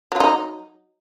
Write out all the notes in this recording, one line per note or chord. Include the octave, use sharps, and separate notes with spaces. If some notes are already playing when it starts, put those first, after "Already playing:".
F#3 D#4 F4